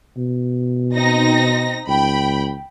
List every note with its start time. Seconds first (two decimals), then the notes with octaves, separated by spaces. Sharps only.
0.17 B2
0.95 C4 D#4 A#6
1.88 C#2 G5 B5